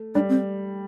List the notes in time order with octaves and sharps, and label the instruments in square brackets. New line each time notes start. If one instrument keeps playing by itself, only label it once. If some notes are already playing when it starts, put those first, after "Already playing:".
Already playing: [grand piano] A3
[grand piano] G3 [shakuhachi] D4
[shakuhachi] C4